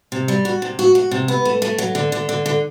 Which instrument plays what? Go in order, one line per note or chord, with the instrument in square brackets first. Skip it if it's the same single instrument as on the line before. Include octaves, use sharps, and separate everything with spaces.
[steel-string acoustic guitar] C3
G3
F#4
C3
F#4
F#4
C3
B3
A3
A3
F#3
D3
D3
D3
D3